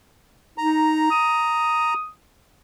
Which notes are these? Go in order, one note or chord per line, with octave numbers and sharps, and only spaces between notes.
D#4 A#5
D#6